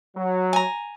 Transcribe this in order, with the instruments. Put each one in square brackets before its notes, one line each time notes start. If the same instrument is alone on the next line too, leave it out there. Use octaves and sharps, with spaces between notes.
[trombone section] F#3
[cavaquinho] G#5 A#5